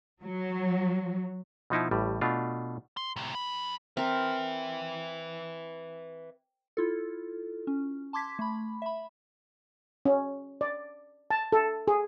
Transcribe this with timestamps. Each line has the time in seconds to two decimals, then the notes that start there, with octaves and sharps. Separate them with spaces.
0.23 F#3
1.70 B2 F3 D#4 E4
1.91 A1 A2 G3
2.21 B2 A3 D4 F4
2.97 C6
3.16 A2 C3
3.35 E2 B5
3.97 C4 A#4 B4 E5
6.77 E4 F4 A4
7.67 C#4
8.13 A5 C6 D6 G#6 B6
8.39 A3 B5
8.82 E5 B5
10.05 C#4
10.61 D5
11.31 A5
11.52 A4
11.88 G#4